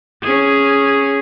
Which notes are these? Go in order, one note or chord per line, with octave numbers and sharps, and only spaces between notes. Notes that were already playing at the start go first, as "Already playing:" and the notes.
C#4 G#4